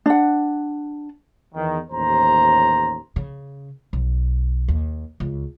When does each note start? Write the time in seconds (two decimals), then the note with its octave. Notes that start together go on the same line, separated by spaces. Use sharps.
0.06 D4 F#5
1.55 E2 D#3
1.91 A1 D#2 C5 A#5
3.16 C#3
3.93 B1
4.68 D#2
5.20 C#2